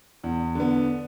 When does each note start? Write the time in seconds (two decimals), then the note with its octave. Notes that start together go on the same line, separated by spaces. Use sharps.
0.24 E2
0.55 D3 B3